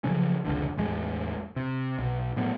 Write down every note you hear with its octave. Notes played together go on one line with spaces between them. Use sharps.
C#3 F3 F#3 C#4
F1 C#2 D3
A1 E2 G#3
C3
B1
A2 F#3 B3